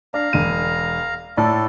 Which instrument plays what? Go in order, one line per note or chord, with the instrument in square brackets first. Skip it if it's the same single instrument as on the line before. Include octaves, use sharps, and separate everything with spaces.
[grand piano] D4 [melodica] F5 A#5
[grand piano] E1 D#7
[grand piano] A2 D5 [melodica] A4